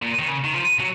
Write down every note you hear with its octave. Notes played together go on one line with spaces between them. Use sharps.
A#2
D#3
C#3
D#3
F3
F#3